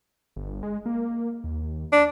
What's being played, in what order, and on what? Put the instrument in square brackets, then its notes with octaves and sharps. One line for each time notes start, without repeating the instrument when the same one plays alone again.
[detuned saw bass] G1
G#3
A#3
D#2
[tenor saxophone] D4